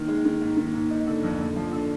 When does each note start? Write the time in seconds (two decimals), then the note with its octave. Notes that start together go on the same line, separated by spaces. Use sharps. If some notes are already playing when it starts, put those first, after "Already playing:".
Already playing: D#3 A#3
0.08 G#3
0.25 D#3
0.41 G#2 A#3
0.57 D#3
0.74 G#2
0.91 D#4
1.06 D3
1.23 F2
1.40 D3 A#3
1.56 F3
1.71 D3